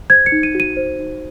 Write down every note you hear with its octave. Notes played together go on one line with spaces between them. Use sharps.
C5 G#6
C#7
D#4
D#7
F#4 D#7
C5
D#4